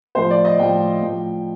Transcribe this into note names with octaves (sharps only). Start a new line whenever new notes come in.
A2 F3 C5
D5
D#5
A2 F3 G5
A2 F3